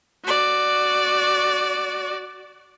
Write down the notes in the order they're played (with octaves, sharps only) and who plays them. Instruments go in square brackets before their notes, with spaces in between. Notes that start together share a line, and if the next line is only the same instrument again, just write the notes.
[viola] F#4 D5